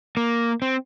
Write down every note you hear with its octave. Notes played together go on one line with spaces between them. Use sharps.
A#3
C4